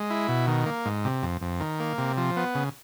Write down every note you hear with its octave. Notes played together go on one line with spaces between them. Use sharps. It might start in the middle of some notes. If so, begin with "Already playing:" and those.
Already playing: G#3
E4
B2
D#3
A#3
G#2
C3
F2
F2
D#3
A#3
C3
F3
B3
C#3